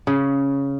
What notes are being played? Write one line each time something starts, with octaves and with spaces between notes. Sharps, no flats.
C#3